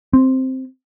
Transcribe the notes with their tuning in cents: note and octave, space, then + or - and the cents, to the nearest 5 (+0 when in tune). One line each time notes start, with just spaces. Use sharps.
C4 +0